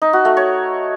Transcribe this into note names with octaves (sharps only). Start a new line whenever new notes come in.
D#4
F#4
A3
C#5